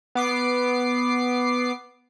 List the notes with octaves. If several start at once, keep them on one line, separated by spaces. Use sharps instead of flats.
B3 D6 C7